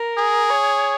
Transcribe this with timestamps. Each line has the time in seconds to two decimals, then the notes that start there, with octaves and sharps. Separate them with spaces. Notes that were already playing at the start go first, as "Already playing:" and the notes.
Already playing: A#4
0.18 G#4
0.50 C#5